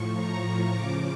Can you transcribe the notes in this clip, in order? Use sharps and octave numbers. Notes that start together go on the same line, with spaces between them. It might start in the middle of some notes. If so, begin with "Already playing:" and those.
Already playing: A2 F3 C#6
A#5
C#3 F3 D6